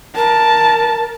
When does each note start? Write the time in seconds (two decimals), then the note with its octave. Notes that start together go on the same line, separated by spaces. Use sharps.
0.16 A#4 A5